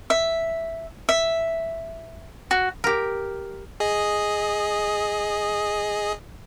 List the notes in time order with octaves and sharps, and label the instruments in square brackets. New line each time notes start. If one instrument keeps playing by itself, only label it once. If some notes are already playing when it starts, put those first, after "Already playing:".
[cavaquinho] E5
E5
F#4
[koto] G4 A#4
[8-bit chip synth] G#4 D#5